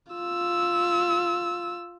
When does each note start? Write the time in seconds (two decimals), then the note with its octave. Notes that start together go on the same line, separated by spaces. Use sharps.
0.12 F4 E6